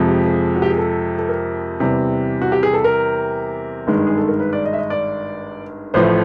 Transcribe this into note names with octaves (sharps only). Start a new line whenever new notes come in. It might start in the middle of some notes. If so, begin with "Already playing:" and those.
Already playing: F2 C3 F3 G#3
G4
G#4
F#4
G4
G#4
A4
A4
A#4
E2 C3 E3 G3
F#4
G4
G#4
A4
A#4
G#1 G2 D#3 G#3
G#4
A4
A#4
B4
D5
D#5
E5
D#5
D5
A1 A2 F3 A3 C5